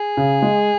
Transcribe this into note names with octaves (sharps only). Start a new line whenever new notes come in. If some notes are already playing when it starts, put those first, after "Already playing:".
Already playing: G#4
C#3
G#3